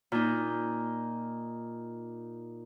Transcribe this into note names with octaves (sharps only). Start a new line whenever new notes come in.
A#2 D#4